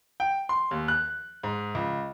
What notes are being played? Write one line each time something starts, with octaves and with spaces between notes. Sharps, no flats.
G5
C6
D#2
F#6
G#2
C#2